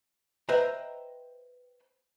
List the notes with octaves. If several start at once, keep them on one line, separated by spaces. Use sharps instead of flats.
B4 C5 D#5 E5 G5 A#5